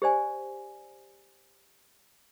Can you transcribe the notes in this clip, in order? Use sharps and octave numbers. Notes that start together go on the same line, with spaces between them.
G4 C5 D5 G#5